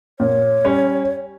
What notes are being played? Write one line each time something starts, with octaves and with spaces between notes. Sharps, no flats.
A#2 C#5
G3 C#4